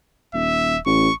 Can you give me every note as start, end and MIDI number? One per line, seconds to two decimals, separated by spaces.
0.34 0.78 27
0.34 0.79 76
0.86 1.09 33
0.86 1.14 85